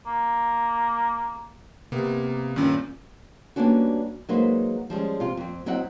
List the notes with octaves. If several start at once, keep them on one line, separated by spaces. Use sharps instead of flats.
A#3
C3 A#3 B3
G2 A#2 D#3 C#4
G3 A#3 B3 C#4 D4 F#4
F#3 G#3 A#3 D#4 B4 C5
F3 G3 G#3 C#4
C3 F4
F2 C4
F#3 C4 E4 D#5 F#5